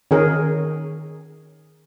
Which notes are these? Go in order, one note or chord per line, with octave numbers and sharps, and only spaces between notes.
D#3 C#4 G#4 A#4